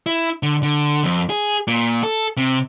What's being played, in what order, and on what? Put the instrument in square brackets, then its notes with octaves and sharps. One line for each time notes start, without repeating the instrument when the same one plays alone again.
[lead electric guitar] E4
D3
D3
F2
G#4
A#2
A4
C3